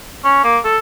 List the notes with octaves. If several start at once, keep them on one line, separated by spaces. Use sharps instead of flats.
C#4
A#3
A4